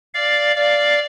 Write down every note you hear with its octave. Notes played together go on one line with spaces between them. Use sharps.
D5 F5
D5 F5